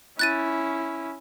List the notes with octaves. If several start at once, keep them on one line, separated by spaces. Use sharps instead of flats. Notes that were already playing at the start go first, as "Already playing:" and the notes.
C#4 E4 F#6 A6 D#7